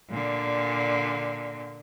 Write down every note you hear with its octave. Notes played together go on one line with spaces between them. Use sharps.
A#2 D3